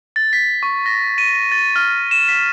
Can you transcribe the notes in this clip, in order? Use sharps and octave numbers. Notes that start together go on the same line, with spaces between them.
A6
B6
C#6
A#6
D#7
A6
F6
E7
B6